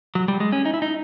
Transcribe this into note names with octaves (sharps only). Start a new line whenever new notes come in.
F#3
G3
G#3
C#4
D#4
E4
D#4